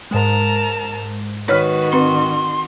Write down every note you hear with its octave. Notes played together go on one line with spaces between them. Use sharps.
G#2 G#3 A#4 A5 A#5
D#3 F#4 B4 C#5 F6
C4 B4 C6